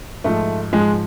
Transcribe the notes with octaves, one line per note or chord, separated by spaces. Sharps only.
G#2 F3 A3
G#2 F3 G#3